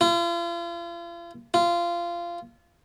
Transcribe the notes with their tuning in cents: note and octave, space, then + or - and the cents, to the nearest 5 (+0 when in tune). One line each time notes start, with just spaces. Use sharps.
F4 -40
F4 -20